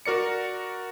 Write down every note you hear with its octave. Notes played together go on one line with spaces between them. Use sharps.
F#4 A#4 D5 C#7